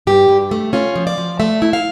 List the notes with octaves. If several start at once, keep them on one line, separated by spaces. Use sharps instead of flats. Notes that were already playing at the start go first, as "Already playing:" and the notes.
G2 G4
G2
A3
C#4 F4
F3
D5
F3
A3 E5
E4
F5